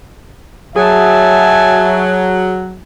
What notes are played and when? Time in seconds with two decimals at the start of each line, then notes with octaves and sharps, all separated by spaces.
0.76 F#3 G#4 E5 G#5 A5